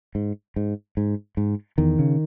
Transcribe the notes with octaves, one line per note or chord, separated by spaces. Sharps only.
G#2
G#2
G#2
G#2
E2 D#3
C#3